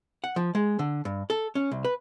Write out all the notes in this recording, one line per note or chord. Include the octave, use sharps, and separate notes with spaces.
F#5
F3
G#3
D3
G2
A4
C#4
C2
B4